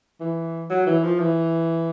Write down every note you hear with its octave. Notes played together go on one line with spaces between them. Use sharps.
E3
F#3
E3
F3
E3